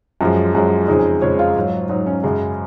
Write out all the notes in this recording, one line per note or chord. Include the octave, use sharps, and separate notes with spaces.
F#2 F3 G#3 C#4
F#2 F3 G#3
F2 C#3 G#3 D#4
G#4
F2 C#3 G#3 C#5
F4
G#2 F#3
G#2 F#3 D#4
C#4
F#2 C#3 G#3